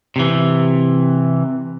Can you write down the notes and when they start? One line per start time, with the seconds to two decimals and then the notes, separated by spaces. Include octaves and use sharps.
0.16 C3 E3